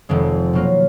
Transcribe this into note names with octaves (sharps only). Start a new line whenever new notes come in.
F1 F2 D#3 G#3
B2 F#3 A#3 F4